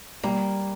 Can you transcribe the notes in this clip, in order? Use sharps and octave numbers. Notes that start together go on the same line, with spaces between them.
G3 A#3